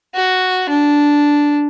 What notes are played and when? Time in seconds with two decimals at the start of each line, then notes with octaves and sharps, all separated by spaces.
0.15 F#4
0.69 D4